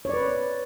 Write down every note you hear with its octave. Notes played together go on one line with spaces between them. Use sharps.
B4 C#5 D5